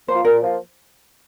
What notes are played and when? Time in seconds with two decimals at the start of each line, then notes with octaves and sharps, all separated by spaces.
0.08 F3 A#3 F4 C5
0.25 A#2 A#4
0.41 F3 A#3 F4